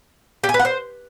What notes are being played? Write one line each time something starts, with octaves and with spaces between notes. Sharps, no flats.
G4
G#5
B4
F#5
C5